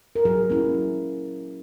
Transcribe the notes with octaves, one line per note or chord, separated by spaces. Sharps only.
A#4
F#3 G#4
A#3 C#4 E4
F#3